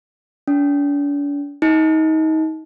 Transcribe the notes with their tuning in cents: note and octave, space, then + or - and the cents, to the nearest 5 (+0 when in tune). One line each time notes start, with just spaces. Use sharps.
D4 -45
D#4 +25